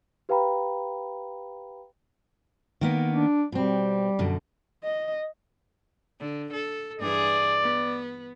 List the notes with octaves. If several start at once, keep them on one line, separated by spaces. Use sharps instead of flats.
G4 B4 F5 G5 A#5 B5
D#3 A#3 B3
D4
B2 G3 C4
F#2 B2 D3
D#5
D3
A4
G2 E3 G#4 D5
B3